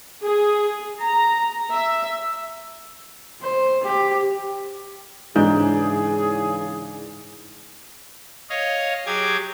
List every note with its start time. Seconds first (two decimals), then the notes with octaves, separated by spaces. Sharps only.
0.22 G#4
1.03 A#5
1.72 E5
3.41 C5
3.84 G4
5.36 G#2 C#3 E3 D4 G#4 G6
8.50 C#5 D#5 F5
9.06 F#3 G4 G#4 D6 G#6